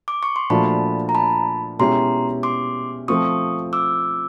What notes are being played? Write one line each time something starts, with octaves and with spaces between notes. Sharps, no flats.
D6
C#6
C6
A#2 F3 A3 D4 F#4 A5 B5
A#5
A5 B5
B2 G#3 C#4 E4 G4 A#5 C6
C6 D6
F3 A3 C4 F4 C#6 D#6
D6 E6